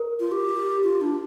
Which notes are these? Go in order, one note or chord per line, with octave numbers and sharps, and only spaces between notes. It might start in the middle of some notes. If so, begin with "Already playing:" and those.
Already playing: A#4
F4
G4
F4
D4